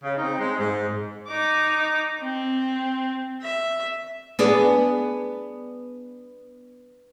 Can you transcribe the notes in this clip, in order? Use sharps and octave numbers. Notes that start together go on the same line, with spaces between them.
C#3
C4 D#4
G#3
G#2
D#4 D6
C4
E5
B3 D4 G#4